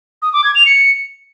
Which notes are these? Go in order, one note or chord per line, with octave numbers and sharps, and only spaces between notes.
D#6
D6
G#6
F7
C#7